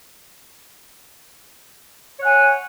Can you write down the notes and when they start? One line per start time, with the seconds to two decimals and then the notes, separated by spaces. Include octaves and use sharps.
2.19 C#5
2.22 F#5
2.25 G#5